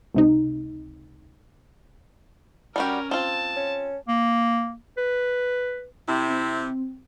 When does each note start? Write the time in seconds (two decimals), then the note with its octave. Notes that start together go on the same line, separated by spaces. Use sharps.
0.14 C#2 C3 D#4
2.76 G3 C#4 F#4 G4 A#4
3.11 C4 F4 A5
3.56 C#4
4.08 A#3
4.97 B4
6.08 C3 E4
6.29 C4